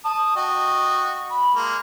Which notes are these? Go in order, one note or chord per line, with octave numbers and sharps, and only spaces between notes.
A5 D#6
F#4 D#5 G5
B5
G#3 A#3